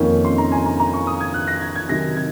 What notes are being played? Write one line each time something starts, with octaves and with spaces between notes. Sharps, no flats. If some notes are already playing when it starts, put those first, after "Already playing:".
Already playing: F2 D#3 A#3 C#4
C6
A#5
G#5
A#5
A#5
C#6
D#6
G#6
F#6
A#6
G#6
G#6
C3 D#3 F#3 A#6
G#6